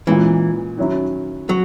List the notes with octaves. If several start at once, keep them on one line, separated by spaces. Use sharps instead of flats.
A#2 E3 G#3 C#4
D#3 F#3 C#4 E4
F#3